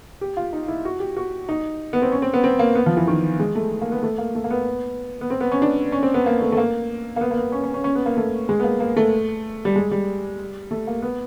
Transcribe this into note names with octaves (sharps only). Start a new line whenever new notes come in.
G4
F4
D#4
E4
F#4
G4
F#4
D#4
B3
C4
C#4
C4
B3
C4
A#3
B3
F3
E3
D#3
G#3
A3
A#3
B3
A3
A#3
A3
A#3
B3
B3
C4
B3
C#4
D4
C#4
C4
B3
A#3
A3
A3
A#3
A#3
B3
A#3
B3
C#4
C#4
C#4
C#4
B3
A#3
A3
G#3
B3
A#3
A#3
A3
G3
G#3
G3
A3
A#3
B3